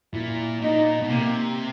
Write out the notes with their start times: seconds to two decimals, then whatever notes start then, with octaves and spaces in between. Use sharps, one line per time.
0.13 A#2 E4
0.62 A#2 D#4
1.02 B2
1.10 C3 A#3